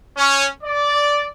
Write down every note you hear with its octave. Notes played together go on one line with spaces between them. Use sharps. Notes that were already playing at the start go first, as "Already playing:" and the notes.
C#4
D5